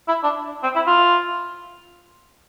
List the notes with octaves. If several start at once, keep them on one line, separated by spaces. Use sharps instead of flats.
E4
D4
C4
E4
F4